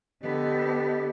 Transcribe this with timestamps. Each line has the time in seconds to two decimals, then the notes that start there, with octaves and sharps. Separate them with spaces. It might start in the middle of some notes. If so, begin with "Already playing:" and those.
0.21 D3 B3 G4 A4 D#5